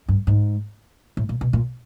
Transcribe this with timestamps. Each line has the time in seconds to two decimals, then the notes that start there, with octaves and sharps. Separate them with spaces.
0.08 G2
0.27 G#2
1.17 A2
1.29 A#2
1.41 B2
1.53 A#2